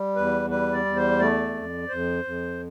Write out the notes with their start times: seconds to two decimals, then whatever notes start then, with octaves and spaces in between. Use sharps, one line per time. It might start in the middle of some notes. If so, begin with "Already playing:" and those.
Already playing: G3
0.16 E2 B4
0.50 G3 B4
0.73 D5
0.85 E2
0.96 C5
1.19 A3 D5
1.54 F2
1.89 F2 C5
2.24 F2